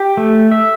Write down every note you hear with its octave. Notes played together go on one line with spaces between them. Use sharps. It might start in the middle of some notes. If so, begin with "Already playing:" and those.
Already playing: G4
A3
E5